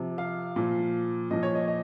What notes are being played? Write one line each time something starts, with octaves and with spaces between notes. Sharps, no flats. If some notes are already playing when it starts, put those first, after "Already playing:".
Already playing: C3 F3
F5
A#2 F3
A#2 F3 D#5
C#5
D#5
D#5